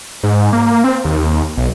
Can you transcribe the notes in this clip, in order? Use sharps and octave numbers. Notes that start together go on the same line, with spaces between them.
G#2
A#3
C4
D#2
B1